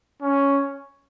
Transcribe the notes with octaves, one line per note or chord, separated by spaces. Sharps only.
C#4